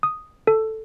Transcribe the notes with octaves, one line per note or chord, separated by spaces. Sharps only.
D#6
A4